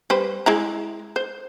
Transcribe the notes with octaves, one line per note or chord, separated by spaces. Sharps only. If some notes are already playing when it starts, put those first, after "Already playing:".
G3 B4 C5
G#3 E4 A#5
C5